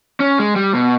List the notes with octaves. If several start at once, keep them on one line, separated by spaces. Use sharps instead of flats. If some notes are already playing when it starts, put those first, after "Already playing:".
C#4
G#3
G3
B2